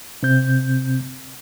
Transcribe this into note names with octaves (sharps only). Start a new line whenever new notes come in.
C3 C4 G6